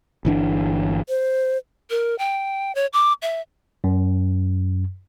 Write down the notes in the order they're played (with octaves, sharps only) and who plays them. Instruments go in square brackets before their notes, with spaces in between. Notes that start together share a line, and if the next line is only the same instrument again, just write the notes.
[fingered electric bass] G1 E3 D4
[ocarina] C5
[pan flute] A#4
G5
C#5
D6
E5
[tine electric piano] F#2